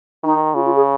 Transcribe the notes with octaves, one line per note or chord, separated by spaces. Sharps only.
D#3 D#4
C#3 F4
F4
G#4